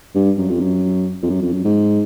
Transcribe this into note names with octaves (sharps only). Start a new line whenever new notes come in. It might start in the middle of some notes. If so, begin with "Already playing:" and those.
G2
F#2
F2
F#2
F2
F#2
F2
F#2
G#2